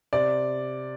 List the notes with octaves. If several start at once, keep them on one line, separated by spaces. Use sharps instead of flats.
C3 D5